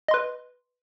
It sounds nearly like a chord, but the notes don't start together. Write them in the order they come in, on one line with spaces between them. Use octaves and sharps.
D#5 C6 B4